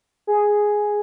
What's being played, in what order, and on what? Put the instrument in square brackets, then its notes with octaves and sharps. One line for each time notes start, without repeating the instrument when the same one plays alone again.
[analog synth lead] G#4